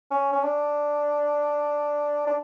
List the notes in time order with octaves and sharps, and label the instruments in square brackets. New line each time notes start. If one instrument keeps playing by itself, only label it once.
[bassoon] C#4
C#4
D4
D4